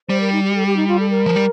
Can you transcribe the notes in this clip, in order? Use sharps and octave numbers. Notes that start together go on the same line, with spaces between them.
G3 C5
A#4
D#4
G4
A4
G4
D#4
F4
A4
A#4
F3
G3